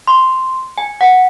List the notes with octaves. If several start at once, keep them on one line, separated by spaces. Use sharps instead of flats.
C6
G#5
F#5